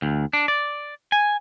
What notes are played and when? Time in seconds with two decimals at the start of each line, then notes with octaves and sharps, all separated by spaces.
0.02 D2
0.33 D4
0.48 D5
1.12 G#5